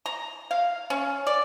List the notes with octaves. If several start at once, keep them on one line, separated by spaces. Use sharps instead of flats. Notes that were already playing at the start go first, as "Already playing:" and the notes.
A#5
F5
C#4
D5